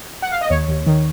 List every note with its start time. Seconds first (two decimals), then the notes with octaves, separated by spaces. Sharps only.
0.22 F#5
0.32 F5
0.41 D#5
0.50 D#2 C#5
0.68 D#2
0.86 D#3